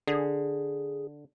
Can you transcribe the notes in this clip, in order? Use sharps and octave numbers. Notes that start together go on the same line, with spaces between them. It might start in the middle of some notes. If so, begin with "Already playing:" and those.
D3 G#4